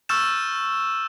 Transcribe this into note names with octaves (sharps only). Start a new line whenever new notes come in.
C#6 E6 F6 G6 A6 E7